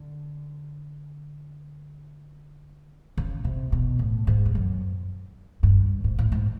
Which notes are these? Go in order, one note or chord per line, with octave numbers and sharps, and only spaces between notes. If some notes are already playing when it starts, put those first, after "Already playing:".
Already playing: D3
C#3
C3
B2
A2
G#2
G2
F#2
G2
G#2
A2
G#2